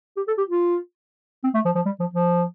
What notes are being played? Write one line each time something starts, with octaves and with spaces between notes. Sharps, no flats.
G4
A4
G4
F4
C4
A3
F3
F3
G3
F3
F3